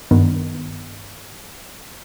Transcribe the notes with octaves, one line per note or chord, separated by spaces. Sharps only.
G2 D#3 B3